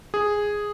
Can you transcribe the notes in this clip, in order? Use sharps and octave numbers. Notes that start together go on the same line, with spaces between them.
G#4